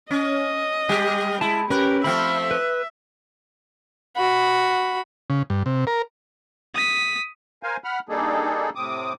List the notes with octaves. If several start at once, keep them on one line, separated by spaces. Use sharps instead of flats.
C#4 D#5
G3 G4
G#3 E4 A5
C#4 G4 A#4 B4
F3 A3 C4 E5 B5 F6
B4
F#4 B5
C#3
G2
C3
A#4
D#6 B6
A#4 C5 F5 G#5
F#5 B5 F6
G3 A#3 D4 D#4 G#4 A4
A2 C3 C4 D6 D#6